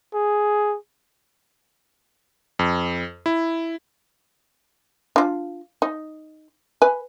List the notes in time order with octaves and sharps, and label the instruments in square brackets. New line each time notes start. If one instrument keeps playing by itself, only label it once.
[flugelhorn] G#4
[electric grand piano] F2
E4
[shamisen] D4 F4
D#4
B4 G#5